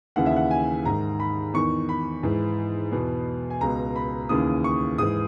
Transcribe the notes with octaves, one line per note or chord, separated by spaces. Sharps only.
D#2 C#3 E3 F#5
E5
F#5
G#5
G#2 D#3 A#5
B5
E2 D#3 C#6
B5
G#2 E3
E2 B2
G#5
C#2 B2 A#5
B5
D#2 C#3 E3 D#6
C#6
G#2 E3 D#6